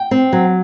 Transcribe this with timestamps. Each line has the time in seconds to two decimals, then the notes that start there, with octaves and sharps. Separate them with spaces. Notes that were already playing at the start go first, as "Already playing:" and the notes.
Already playing: G5
0.11 C4
0.33 F#3